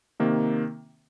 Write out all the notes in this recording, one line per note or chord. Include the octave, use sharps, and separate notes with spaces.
C3 D#3 A#3